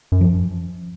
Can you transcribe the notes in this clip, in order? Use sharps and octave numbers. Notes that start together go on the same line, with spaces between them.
F#2
F3